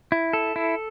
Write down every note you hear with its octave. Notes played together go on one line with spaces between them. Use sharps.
E4
A4
E4